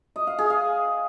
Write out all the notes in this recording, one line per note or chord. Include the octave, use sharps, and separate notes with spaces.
D#5
F5
G#4
F5